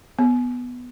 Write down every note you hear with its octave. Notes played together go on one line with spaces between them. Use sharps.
B3